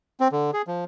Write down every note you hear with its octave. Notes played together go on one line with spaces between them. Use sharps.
C4
D3
G#4
F3